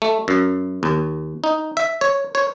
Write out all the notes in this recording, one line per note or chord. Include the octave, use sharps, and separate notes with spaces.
A3
F#2
D#2
D#4
E5
C#5
C#5